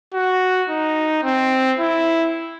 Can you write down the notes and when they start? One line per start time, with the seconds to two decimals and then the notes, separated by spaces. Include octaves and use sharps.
0.14 F#4
0.69 D#4
1.24 C4
1.79 E4